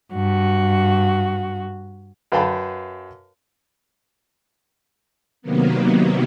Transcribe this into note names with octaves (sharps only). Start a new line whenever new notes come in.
G2 F#4
F#2 B4 F5 G5 A5 B5
C3 D#3 F#3 A#3 B3